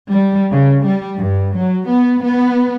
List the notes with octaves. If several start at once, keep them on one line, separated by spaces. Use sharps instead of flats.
G3
C#3
G3
G2
F#3
B3
B3